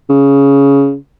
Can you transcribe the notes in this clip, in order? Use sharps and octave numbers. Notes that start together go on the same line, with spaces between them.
C#3